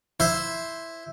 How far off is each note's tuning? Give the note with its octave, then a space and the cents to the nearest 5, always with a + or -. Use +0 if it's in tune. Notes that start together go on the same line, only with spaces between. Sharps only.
E4 +0 C5 +0